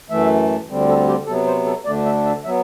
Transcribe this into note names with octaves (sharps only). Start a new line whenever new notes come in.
F#2 E3 A3 E5
D2 D3 G3 C4
A4
G4
C3 F#3 B3 A4
C5
A4
D2 D3 A3 D4 D5
E5
E5
F#3 B3 E5